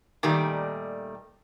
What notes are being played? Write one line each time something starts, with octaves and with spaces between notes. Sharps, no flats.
A#2 D#3 G3 A3 G4